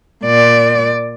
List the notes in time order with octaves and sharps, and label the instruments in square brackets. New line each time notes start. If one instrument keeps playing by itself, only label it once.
[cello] A#2 D5